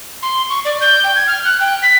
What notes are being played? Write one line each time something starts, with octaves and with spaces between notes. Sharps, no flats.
C6
C#6
D5
G6
G5
G#6
F6
F#6
G5
B6